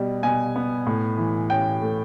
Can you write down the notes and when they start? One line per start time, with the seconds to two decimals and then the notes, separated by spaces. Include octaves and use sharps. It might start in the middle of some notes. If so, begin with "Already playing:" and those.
Already playing: B2 G3
0.23 B2 G#5
0.56 B3
0.87 A2
1.18 E3
1.50 C#4 G5
1.82 A3